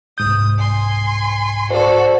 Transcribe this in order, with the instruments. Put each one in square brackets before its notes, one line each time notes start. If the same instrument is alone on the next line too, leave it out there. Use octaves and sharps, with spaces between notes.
[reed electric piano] C2 G#2 G6 [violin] D#6
[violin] G#5 C6
[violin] F#4 A4 [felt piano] C5 D5